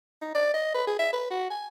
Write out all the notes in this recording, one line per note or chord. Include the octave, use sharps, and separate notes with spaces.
D#4
D5
D#5
B4
G#4
E5
B4
F#4
G#5